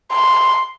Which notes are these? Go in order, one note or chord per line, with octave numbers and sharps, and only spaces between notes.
C6